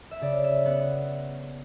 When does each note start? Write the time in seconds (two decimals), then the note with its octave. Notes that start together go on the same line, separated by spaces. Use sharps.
0.11 E5
0.21 C#3 D5
0.44 E5
0.65 B3 F#5